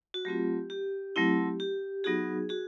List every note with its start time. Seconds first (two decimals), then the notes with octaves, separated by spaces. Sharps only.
0.14 F#4
0.25 F#3 A3 C4 F4 G4
0.70 G4
1.16 F#3 A3 C4 E4
1.60 G4
2.04 F#3 B3 D#4 F#4 G#4
2.49 F#4 G#4